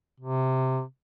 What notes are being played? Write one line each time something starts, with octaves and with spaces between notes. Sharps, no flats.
C3